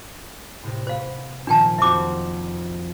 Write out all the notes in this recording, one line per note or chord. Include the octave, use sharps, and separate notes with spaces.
A2 C3
B3 C5 F5
A#2 D#3 F3 D4 G5 A5
F2 C4 F#4 E5 D6